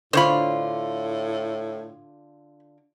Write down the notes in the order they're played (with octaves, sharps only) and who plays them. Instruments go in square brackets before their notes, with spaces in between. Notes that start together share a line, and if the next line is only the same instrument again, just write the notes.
[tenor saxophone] A2 [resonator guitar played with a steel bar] D3 F4 [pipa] C5 C#5 B5